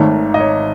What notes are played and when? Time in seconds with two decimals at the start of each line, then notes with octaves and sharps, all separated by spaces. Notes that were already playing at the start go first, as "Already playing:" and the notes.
Already playing: G#1 G#2 D#3 A3 C#5
0.34 D#5
0.40 C#5